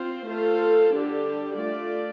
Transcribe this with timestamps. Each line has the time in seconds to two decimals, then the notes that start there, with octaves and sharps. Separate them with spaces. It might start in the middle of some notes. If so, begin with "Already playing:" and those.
Already playing: C4 F4 C5
0.28 A3 F4 A4 C5
0.94 D3 G3 D4 G4
1.58 A3 F4 D5